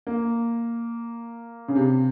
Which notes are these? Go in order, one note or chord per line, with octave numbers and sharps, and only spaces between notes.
A#3
C#3
C3